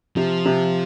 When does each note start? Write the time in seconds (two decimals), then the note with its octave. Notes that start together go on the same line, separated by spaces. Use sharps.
0.16 C3 F3
0.46 C3